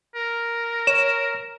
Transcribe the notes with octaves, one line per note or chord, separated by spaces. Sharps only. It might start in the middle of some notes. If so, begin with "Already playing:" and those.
A#4
C#5 E7